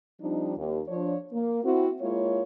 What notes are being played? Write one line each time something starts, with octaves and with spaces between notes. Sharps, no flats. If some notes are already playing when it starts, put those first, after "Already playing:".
F3 G3 C4 D4 D#4
D#2
F3 D4 C#5
A#3
C4 E4 F#4
G#3 A#3 E4 F4 C#5